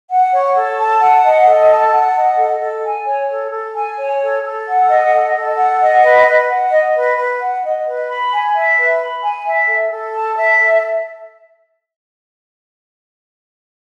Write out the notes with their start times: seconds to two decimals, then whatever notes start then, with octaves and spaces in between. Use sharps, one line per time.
0.10 F#5
0.32 C#5
0.55 A4
0.78 A5
1.01 F#5
1.24 D#5
1.46 A4
1.69 A5
1.92 F#5
2.15 D#5
2.37 A4
2.60 A4
2.84 G#5
3.07 C#5
3.29 A4
3.52 A4
3.74 G#5
3.98 C#5
4.20 A4
4.43 A4
4.67 F#5
4.89 D#5
5.12 A4
5.34 A4
5.57 F#5
5.81 D#5
6.02 B4
6.26 B4
6.49 F#5
6.71 D#5
6.95 B4
7.17 B4
7.40 F#5
7.63 D#5
7.85 B4
8.09 B5
8.32 G#5
8.54 E5
8.77 B4
8.99 B5
9.22 G#5
9.45 E5
9.67 A4
9.91 A4
10.13 A5
10.37 E5
10.59 A4